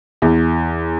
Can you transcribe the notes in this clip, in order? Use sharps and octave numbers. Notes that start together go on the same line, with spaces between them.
E2